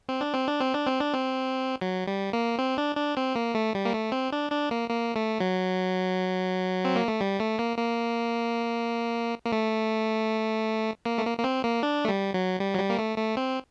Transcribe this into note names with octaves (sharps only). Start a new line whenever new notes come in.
C4
D4
C4
D4
C4
D4
C4
D4
C4
F#3
G3
A#3
C4
D4
D4
C4
A#3
A3
G3
A#3
A3
C4
D4
D4
A#3
A#3
A3
F#3
C4
A#3
A3
G3
A3
A#3
A#3
A#3
A3
A#3
A3
A#3
A#3
C4
A#3
D4
A3
G3
F#3
G3
F#3
G3
A#3
A3
A3
C4